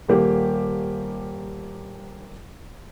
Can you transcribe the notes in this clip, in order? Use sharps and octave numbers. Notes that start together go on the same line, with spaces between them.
D#1 A#3 G4